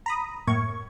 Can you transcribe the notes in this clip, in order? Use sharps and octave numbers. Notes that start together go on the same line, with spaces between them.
A#5 B5 D#6
F#2 A2 A#3 C#6 G#6